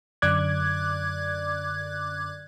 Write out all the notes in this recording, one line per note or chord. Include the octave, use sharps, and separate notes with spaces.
F#2 D3 D5 D6 F#6 G#6